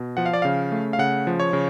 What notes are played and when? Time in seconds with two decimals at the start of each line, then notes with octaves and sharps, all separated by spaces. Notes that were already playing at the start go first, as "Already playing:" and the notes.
Already playing: B2
0.17 F3 F#5
0.26 F5
0.34 D5
0.42 C#3 F5
0.72 A3
0.93 F5
0.99 C#3 F#5
1.27 F3
1.40 C#5
1.53 C#3